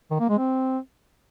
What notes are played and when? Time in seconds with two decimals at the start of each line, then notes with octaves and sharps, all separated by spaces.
0.11 D#3
0.20 A#3
0.29 G#3
0.38 C4